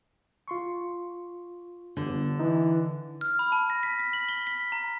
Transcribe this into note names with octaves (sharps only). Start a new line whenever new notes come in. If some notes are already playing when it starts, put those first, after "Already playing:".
F4 C6 C#6
G1 D3
E3 D#4
F6
B5
A5
A#6
B6
B6
F#7
G7
B6
A#5